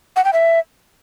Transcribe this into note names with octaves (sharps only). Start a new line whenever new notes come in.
F#5
G5
E5